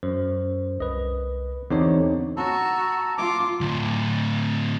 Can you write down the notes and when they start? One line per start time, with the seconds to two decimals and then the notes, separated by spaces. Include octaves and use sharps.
0.03 F#2 C5
0.80 C2 B4 D#5
1.70 E2 D3 C4 D#4 G4 C#5
2.37 F#4 A5 A#5 E6
3.18 F4 D6
3.61 D2 A2